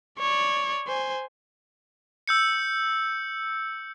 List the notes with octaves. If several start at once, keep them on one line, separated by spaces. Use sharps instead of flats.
C#5 D5
C5 G#5
E6 G6 C#7